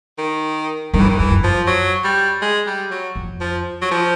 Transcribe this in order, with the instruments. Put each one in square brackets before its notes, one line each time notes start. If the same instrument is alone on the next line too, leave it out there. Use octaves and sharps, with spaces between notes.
[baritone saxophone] D#3
[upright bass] G2 [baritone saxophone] D#3
[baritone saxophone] E3
D#3
[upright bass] G2 [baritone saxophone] E3
[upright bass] F#2
[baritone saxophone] F3
F#3
G3
G#3
G3
F#3
[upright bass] F2
[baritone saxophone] F3
F#3
F3